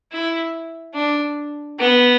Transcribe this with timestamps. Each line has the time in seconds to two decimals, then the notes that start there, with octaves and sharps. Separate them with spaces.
0.13 E4
0.95 D4
1.79 B3